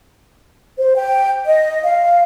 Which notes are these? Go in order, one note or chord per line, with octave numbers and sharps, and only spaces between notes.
C5
G5
D#5
F5